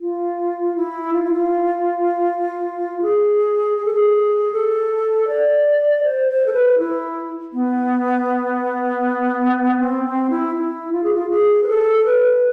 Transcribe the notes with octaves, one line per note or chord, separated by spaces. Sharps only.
F4
E4
F4
E4
F4
G#4
G#4
A4
G#4
A4
D5
C5
C5
A4
B4
E4
B3
C4
C4
E4
E4
F4
G#4
F4
G#4
B4
A4
B4